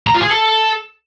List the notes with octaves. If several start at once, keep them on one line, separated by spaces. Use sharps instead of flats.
A#5
F4
G#4
A4